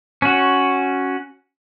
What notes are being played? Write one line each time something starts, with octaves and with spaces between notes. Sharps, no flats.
C#4 F#4